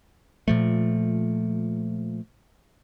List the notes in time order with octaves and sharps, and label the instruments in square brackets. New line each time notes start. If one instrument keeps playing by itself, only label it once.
[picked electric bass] A#2 F3 A3